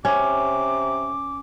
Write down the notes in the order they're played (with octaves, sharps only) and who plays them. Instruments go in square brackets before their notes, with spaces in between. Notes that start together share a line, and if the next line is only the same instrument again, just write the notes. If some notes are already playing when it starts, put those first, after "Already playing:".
[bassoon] C3 [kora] C#4 [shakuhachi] D6